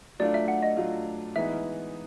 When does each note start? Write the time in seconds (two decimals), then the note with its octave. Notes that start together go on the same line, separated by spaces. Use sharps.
0.19 F#3 A3 D4 F4 D5
0.34 E5
0.48 F#5
0.63 D#5
0.77 F#3 A3 D4 F4
1.36 E3 G#3 B3 D#4 E5